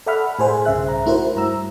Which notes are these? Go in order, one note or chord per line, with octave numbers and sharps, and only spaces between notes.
A4 D5 E5 F#5 B5 F6
A2 G#4 A#4 C5 G#5
B1 G2 C#3 G#4 E5 F#6
A#5
A3 E4 F#4 A#4 C5
G2 A#5 E6